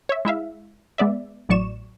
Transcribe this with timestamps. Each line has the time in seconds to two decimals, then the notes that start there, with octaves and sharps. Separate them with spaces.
0.09 C#5 E5
0.25 G#3 E4 E5 F5
0.98 G#3 B3 D5 E5
1.49 A1 A2 F#3 D5 C#6 E7